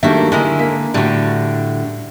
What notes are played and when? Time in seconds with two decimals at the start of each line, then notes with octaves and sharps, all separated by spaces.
0.03 D#3 G3 A3 A#3 D4 F#4 E5
0.32 D3 G#3 E4 A#4
0.59 A#3 B6
0.94 A2 D3 G3 F#4 G4